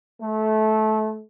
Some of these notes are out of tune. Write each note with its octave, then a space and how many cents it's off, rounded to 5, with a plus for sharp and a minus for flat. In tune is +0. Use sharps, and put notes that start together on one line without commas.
A3 -20